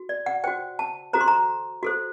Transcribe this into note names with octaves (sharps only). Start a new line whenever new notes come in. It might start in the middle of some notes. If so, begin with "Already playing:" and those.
Already playing: F#4
D5
F#5
F#4 C5 G5
A5
F#4 A4 C5 A#5
C6
A#5
F#4 A4 C5